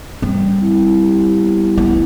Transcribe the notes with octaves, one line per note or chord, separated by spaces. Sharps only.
G3 C4
E4
G4
B3
B3 E4